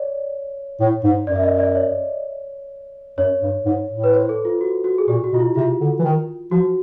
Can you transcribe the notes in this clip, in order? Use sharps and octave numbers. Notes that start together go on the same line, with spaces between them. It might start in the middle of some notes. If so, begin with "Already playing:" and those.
Already playing: C#5 D5
A2
G#2
F#2 D5
E5
D#5
D5
C#5
F#2 C#5
G2
G#2
A2
B4
C5
A4
F4
F#4
F#4
G#4
A#2 G4
F#4
B2 F4
E4
C3 F4
D3
E3
D#3
F3 F#4